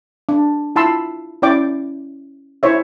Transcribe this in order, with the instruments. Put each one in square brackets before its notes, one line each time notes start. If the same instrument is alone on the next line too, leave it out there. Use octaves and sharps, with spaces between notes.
[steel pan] D4
E4 F4 A5 B5 C6 E6
C#4 E4 D5 G5 D6
E4 C5 C#5 E5